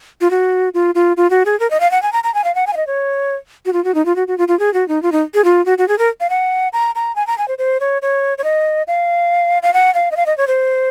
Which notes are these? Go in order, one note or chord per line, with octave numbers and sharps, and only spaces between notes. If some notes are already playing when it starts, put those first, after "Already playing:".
F4
F#4
F4
F4
F4
F#4
G#4
A#4
D#5
F5
F#5
G#5
A#5
A#5
G#5
F5
F#5
G#5
F5
D#5
C#5
F#4
F4
F#4
D#4
F4
F#4
F#4
F4
F4
G#4
F#4
D#4
F4
D#4
G#4
F4
F#4
F#4
G#4
A#4
F5
F#5
A#5
A#5
G#5
A#5
G#5
C5
C5
C#5
C#5
C#5
D#5
F5
F5
F#5
F5
D#5
F5
D#5
C#5
C5